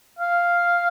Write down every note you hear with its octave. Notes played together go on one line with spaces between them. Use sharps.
F5